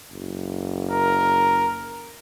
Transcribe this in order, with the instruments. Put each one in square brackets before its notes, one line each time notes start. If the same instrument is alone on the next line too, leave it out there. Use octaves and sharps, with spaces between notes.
[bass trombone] F#1
[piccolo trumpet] A#4